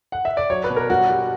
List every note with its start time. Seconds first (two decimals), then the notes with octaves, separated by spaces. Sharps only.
0.12 F#5
0.25 E5
0.37 D5
0.50 F#3 C#5
0.64 B4
0.70 B2
0.76 A#4
0.90 G2 F#4
1.09 G3